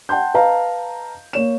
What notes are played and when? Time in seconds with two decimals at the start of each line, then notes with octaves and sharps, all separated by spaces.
0.09 F#5 G5 A5 C6 G6
0.34 B4 D#5 F5 A5 A#5
1.33 A#3 C#5 E7